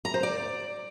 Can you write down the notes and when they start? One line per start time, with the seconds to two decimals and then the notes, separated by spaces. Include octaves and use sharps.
0.05 A#5
0.14 C5
0.23 D5